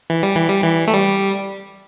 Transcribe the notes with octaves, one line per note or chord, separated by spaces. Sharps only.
E3
G3
E3
G3
E3
A3
G3